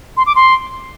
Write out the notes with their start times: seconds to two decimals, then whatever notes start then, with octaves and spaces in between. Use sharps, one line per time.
0.17 C6
0.26 D6
0.36 C6